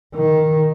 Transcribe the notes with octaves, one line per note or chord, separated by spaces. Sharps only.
D#3